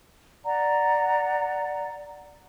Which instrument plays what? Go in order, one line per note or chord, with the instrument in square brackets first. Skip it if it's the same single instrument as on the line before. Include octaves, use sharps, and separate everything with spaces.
[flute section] D5 F#5 A#5